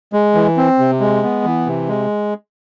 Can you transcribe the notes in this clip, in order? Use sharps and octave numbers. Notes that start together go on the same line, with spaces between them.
G#3
E3
C4
C3
G#3
B3
E3
C3
G#3